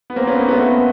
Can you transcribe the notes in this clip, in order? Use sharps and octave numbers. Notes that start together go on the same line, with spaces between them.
B3
A#3 C4
B3 C#4
A#3 C4
A3 B3
A3 B3